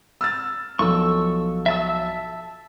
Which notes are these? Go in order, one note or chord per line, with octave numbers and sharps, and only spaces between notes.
E6 F6 A6
B1 F3 A4 C#6 E6
E5 A5 E6